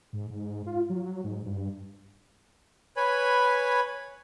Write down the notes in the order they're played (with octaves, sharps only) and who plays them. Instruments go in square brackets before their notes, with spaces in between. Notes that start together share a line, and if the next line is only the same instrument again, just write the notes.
[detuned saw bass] G#2
G#2
F4
F#3
G#2
G2
[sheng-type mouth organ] B4 C#5 G#5 B5